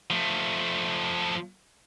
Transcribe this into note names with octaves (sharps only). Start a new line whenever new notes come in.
F3 A3